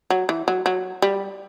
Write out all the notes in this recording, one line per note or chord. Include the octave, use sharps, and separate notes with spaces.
F#3
E3
F#3
F#3
G3